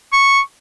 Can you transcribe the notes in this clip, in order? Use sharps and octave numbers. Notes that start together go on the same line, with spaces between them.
C#6